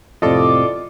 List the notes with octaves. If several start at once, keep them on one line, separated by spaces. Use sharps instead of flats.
F2 A2 C3 F4 A4 D5 D#5 D6